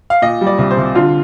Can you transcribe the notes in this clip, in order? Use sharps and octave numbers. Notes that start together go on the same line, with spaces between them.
F5
A#2 D#5
G3
D5
C2
C5
C2
D3 F4